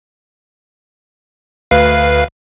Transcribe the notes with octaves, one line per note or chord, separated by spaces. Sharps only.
D2 B4 F5